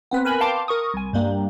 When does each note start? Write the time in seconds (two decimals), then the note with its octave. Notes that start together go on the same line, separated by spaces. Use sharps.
0.11 B3 C4 B4
0.25 A#4 B4 G#5 B5
0.41 F5 G5 A5 C6 D6
0.68 A#4 C#6 D#6
0.94 C2 G#5
1.13 G2 G3 A#3